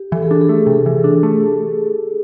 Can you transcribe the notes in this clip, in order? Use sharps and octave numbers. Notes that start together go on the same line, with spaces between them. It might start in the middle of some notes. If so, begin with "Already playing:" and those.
Already playing: G4
E3 A4
G#4
D4 G4
G#4
A3
C3
E3
D4
A3